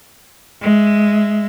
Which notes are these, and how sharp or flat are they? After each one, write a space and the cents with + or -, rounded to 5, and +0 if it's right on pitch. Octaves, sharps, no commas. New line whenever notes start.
G#3 +0 E5 +0